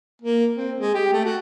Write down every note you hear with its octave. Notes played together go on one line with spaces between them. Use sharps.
A#3
C4
G#3
G4
A3
F#4